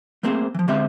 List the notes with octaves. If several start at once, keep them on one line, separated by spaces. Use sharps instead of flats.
A3 A#3 C4 G#4 C5
E3 F3
D3 G#3 C4 G4 C5 E5